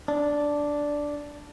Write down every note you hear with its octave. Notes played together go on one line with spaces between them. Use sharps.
D4